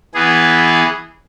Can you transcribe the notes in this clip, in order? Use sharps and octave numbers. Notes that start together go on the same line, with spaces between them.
E3 B3 G#4